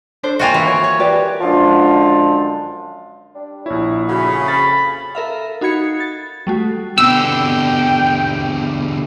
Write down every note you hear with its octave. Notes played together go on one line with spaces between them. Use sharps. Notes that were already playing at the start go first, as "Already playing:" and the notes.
D4 A4 C5
A#3 F4 F#4 D#5 G5 G#5
E3 C5
C#5
C#5
G4 B4 D5
F#2 D3 F3 G#3 D4 F4
G3 D4
A#1 E4 C#5
A2 C#3 F#4 B5
F2 B5 A6
A4 A#4 E5 F5
D#4 F#4 B5 G#6 C#7
A6
G3 A3 F#4
B2 D3 B3 C4 G5 E6